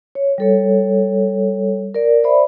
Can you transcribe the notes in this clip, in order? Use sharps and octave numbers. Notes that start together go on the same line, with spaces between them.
C#5
G3 A4 C#5
A#4 D5
C5 D5 E5 B5